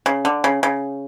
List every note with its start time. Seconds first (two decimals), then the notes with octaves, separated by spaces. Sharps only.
0.06 C#3
0.25 D3
0.44 C#3
0.63 C#3